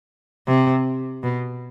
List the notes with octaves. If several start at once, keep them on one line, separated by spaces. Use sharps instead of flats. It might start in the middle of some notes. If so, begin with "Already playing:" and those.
C3
B2